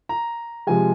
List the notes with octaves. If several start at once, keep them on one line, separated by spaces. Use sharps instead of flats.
A#5
C3 F3 G#3 G#5